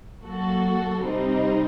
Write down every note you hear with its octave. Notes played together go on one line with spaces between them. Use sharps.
F#3 A#3 F#4 A4
C3 G3 C4 D#4